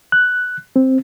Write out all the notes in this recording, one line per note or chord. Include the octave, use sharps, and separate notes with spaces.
F#6
C4